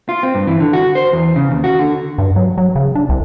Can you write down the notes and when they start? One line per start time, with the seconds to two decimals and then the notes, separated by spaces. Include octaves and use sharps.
0.09 F4
0.23 C4
0.35 G2
0.47 E3
0.60 D3
0.73 F#4
0.95 C5
1.12 E2
1.36 C#3
1.51 D#2
1.64 F#4
1.79 D3
2.18 G2
2.36 F#3
2.58 F#3
2.75 C#3
2.95 D4
3.09 C2